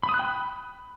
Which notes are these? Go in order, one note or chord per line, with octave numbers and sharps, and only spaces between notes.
B5
D#6
F#6
G5
B5